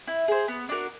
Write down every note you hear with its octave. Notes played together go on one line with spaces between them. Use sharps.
E4
G#4 C5
B3
D4 F#4 A#4